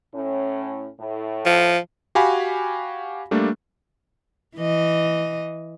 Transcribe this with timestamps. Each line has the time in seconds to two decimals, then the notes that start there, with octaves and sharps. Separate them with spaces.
0.15 A2 C#4
1.00 A2
1.46 F3
2.15 F#4 G4 F5 G#5 B5
3.31 G3 A3 A#3 D4
4.56 E3 D#5